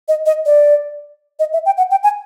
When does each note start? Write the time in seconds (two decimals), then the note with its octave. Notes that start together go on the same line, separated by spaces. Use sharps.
0.08 D#5
0.26 D#5
0.46 D5
1.39 D#5
1.53 E5
1.66 G5
1.77 F#5
1.91 G5
2.03 G#5